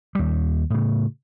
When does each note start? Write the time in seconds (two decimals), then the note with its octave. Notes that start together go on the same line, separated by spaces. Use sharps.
0.15 D#2 G3
0.70 A2 C#3